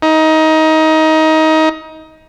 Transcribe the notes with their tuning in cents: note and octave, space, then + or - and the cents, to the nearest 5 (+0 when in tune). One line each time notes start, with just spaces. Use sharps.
D#4 +20